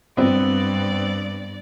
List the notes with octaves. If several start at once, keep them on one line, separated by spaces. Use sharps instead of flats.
G2 B3 C4 D5